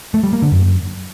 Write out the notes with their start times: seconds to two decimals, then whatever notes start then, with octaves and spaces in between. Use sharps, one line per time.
0.14 A3
0.23 G3
0.33 A#3
0.42 D3
0.52 F#2